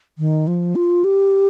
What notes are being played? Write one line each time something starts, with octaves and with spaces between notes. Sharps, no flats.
D#3
F3
F4
G4